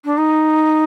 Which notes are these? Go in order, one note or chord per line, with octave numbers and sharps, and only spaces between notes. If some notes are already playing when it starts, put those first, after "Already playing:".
D4
D#4